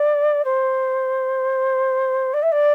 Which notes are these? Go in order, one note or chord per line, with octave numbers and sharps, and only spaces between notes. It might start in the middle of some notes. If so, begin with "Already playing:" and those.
Already playing: D5
C5
D5
E5
D5